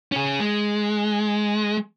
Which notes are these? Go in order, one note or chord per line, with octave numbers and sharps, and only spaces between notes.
C#4 G#4
G#3